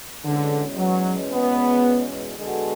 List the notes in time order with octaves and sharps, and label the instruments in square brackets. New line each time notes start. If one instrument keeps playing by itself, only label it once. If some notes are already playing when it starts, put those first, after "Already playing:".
[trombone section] E2 B2 G#3 C#4 [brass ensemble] D3
[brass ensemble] F#3
B3
[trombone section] D3 G#3 B3 F#4 A4